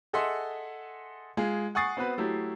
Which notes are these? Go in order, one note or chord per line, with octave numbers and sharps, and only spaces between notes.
G#4 A4 D#5 E5 F#5 C6
G#3 F4 G#4
F#5 G#5 C#6 D#6 A6 C7
B3 C4 F#4 B4
F#3 A3 E4 G4